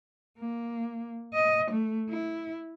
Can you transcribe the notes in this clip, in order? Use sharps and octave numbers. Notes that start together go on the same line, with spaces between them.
A#3
D#5
A3
E4